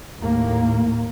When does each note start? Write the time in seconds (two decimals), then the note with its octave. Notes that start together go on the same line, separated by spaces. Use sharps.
0.19 D#2 A2 A#3